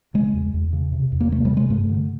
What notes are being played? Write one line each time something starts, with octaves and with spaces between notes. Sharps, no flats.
C#3 G#3
E2
E2
C#3
C3
E2
A#3
C3 A3
G3
C3
G#3
G2 A3
D3